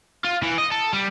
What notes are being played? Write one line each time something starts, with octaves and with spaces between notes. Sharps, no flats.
F4
E3
D#5
A4
G3